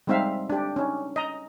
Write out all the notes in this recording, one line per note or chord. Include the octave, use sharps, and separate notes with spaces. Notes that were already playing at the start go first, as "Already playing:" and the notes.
G3 G#3 C4 D#4 E5 F5
D4 G4
C#4 D#4
D#5 A#5